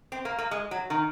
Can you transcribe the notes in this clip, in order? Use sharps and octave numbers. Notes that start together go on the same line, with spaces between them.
C4
A#3
A#3
G#3
F#3
D#3